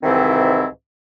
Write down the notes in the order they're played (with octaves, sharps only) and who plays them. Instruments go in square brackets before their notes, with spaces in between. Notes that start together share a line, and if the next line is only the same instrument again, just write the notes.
[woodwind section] C2 G#2 D#3 E3 C4 E4